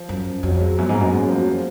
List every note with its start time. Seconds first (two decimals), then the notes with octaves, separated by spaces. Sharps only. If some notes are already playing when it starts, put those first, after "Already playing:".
Already playing: F3
0.09 F#2
0.43 F2 F#3
0.55 F#3
0.61 G#3
0.78 F#2 B3
0.89 G#2
0.95 A#3
1.00 F#2
1.12 G#3
1.21 F#3
1.29 F3
1.39 F#3
1.45 G#3